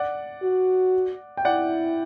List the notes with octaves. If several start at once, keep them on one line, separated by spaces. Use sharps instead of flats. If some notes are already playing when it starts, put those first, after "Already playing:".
Already playing: D5 F#5
F#4
G5
E4 D5 F#5